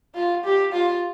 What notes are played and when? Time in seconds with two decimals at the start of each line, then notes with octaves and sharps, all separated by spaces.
0.15 F4
0.44 G4
0.73 F4